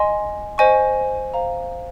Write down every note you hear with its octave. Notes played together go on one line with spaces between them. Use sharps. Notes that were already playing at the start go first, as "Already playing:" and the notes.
Already playing: D#5 G#5 C6
C5 D#5 G#5 C#6
C5 F5 A#5